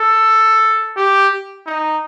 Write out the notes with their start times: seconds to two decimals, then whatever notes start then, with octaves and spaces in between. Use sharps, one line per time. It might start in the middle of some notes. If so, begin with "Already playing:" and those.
Already playing: A4
0.97 G4
1.66 D#4